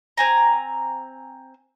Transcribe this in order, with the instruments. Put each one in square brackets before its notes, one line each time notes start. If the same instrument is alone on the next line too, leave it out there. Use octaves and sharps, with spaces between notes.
[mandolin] C4 G#5 A#5